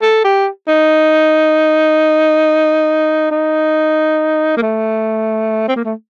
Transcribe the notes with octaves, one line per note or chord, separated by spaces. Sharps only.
A4
G4
D#4
D#4
A#3
A3
C4
A#3
A3